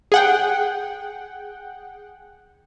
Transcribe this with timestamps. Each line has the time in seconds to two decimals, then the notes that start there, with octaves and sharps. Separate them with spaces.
0.12 G#4 F#5 G5